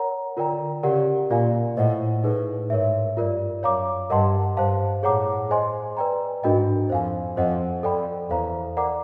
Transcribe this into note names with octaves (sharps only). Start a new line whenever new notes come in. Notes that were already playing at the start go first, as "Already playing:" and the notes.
Already playing: A#4 C#5 F#5 A#5
D3 F4 A#4 D5 G5 A#5
C#3 G4 A#4 D5 F#5
A#2 F4 A#4 D5 F5 G#5
A2 C5 D#5 F#5
A2 D#4 G#4 B4
G#2 A#4 C#5 E5
G2 F4 A#4 D5
F#2 C#5 F5 A#5 D6
G2 A#4 D#5 F#5 A5 C6
G2 C5 F5 A5
A2 G#4 C#5 F#5 A#5 D6
G#4 C5 D#5 G#5 C6
B4 D5 G5 A#5
G#2 D4 F#4 A#4 D#5 G5
F2 C5 F5 G#5
F2 C5 D#5 F#5
F2 A4 D5 G5 B5
E2 A4 C5 F5 A#5
A#4 D5 F#5 A#5 D6